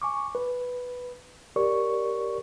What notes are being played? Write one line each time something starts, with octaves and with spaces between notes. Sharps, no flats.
G#5 C#6 D6
B4
G4 A#4 C#5 D5 C#6